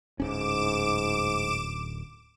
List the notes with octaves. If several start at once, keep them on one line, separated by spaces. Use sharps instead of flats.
D1 G#2 C#4 D6 D7 E7